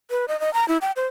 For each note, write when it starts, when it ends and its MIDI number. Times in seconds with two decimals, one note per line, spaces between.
0.11 0.25 71
0.28 0.39 75
0.40 0.53 75
0.54 0.67 82
0.68 0.78 64
0.81 0.91 79
0.96 1.06 72